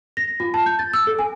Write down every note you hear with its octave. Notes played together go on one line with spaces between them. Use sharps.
A#6
F4
A5
G6
A6
E6
A4
G#5